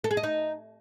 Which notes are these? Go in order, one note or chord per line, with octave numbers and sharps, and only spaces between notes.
A4
G#4
D#5
D#4